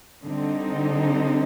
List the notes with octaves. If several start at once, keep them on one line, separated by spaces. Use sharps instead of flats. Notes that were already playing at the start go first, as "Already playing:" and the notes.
D3 G3 C4 D#4